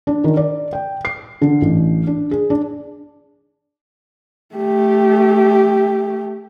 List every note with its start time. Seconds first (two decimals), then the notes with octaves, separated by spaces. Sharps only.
0.07 D4
0.24 D#3
0.37 D5
0.73 G5
1.05 C7
1.42 D3
1.62 A1
2.07 D4
2.31 G#4
2.50 D4
4.55 A3 G4